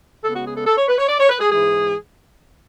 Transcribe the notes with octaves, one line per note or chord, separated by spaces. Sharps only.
C#3 G#3 B3 A4
F#4
G#4
A4
A4
C#5
B4
C#5
D5
C#5
B4
G#4
G#2 E3 G#3 G#4